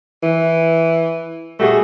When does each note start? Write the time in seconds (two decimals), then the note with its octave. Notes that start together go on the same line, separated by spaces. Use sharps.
0.23 E3
1.60 G3 A3 F#4 G#4